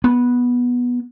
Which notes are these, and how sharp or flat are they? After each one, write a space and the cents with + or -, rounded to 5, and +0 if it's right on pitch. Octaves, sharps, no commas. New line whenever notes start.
B3 -10